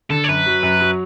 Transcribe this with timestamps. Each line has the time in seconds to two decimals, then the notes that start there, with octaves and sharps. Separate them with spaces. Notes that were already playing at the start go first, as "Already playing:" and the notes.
0.10 D3 A4
0.24 C#5
0.28 F#2 B4
0.46 F#3
0.63 F#2
0.81 F#3